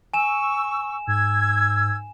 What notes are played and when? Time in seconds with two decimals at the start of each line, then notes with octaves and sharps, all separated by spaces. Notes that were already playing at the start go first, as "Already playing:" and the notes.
0.14 G#5 C#6 E6 E7
1.07 G#2 E6 G#6